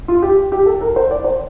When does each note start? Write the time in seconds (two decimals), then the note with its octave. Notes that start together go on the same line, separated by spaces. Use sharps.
0.08 F4
0.22 G4
0.52 G4
0.66 A4
0.81 A#4
0.96 C5
1.11 D5
1.24 C5